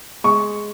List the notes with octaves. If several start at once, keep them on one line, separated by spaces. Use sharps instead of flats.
G#3 C#6